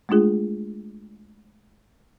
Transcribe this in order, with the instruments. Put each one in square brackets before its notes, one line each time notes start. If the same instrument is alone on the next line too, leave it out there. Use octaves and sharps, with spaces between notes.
[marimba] G#3 A3 D4 F4 G#4